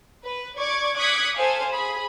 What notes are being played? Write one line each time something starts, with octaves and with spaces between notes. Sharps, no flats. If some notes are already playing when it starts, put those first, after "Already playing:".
B4
D5 C#6 D6 G#6
D6 D#6 F#6 G#6 B6 C#7
A4 C5 F5 G#5
G#4 B5